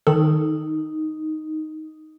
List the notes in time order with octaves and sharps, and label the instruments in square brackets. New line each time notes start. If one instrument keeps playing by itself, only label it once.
[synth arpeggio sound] D#3 A4 [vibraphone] D#4